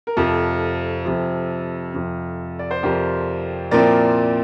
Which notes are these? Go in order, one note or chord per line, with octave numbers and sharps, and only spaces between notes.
A#4
F2 C3 F3 A4
F2 C3 F3
F2 C3 F3
D5
C5
F2 C3 F3 G4 A#4
A#2 F3 C4 E4 A#4 D5